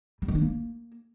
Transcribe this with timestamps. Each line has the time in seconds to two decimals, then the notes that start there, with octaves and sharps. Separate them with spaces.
0.22 G3
0.28 D#3
0.35 D4
0.41 A#3